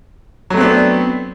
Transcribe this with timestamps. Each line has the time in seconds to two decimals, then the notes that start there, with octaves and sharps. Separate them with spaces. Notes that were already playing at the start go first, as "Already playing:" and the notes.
0.50 F#3
0.54 A3
0.57 C4
0.61 B3
0.64 D4